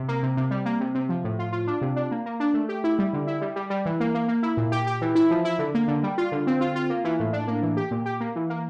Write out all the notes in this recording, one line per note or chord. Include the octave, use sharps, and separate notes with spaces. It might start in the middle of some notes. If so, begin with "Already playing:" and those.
Already playing: C3
A#3
C3
C3
G3
A#3
C3
C3
F3
A2
F4
F4
D4
C3
D4
A#3
A#3
D4
A3
G4
E4
G3
D3
E4
G3
G3
G3
E3
A#3
A#3
A#3
E4
A#2
G4
G4
E3
E4
F3
E4
D3
A#3
D3
G3
F4
D3
C4
F4
F4
A#3
E3
A2
D4
A#3
E3
G4
A#2
G4
A#3
E3
A#3